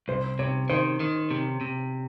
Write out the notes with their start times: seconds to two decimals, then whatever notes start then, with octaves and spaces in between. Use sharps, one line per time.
0.08 C2 C5
0.39 C3 C#5
0.69 D#3 C5
1.00 D#3
1.31 C3
1.61 C3